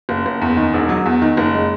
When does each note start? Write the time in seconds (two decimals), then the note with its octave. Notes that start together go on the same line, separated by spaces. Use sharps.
0.09 F#1
0.26 F#1
0.41 E2
0.57 D#3
0.74 E1
0.89 F#3
1.06 E2
1.22 D#3
1.37 F#1
1.54 G#3